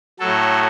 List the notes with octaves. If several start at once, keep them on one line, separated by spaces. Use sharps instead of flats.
A2 F#3 A4